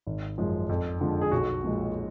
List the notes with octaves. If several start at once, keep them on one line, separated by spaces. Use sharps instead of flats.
G#1
F#2 F3 G#3
F2
D3 F3 G#3
G#4
B1 F#4
A#2 F3 G#3